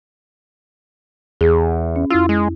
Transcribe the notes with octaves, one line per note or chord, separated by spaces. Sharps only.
E2 G#4
C#4
F2 E4 F4 E6
G#3